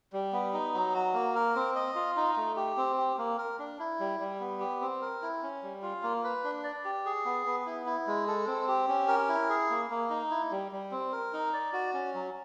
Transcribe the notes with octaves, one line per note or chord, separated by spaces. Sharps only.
G3
B3
D#4
F#3
F#4
A#3
A#4
C4
D#5
F4
D#4
A3
G4
C4
G4
A#3
A#4
D4
E4
G3
G3
B3
G4
C4
A#4
E4
C#4
G3
F4
A#3
B4
D4
D5
G4
G#4
B3
B3
E4
E4
G#3
A4
C4
G4
C#4
A#4
E4
G#4
A#3
A#3
D#4
E4
G3
G3
C4
A#4
D#4
D5
F#4
C#4
F#3